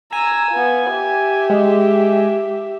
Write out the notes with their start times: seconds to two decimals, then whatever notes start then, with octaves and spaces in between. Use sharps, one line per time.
0.12 G#5 A#5 E6
0.51 B3 F4
0.91 G4 E5
1.50 G#3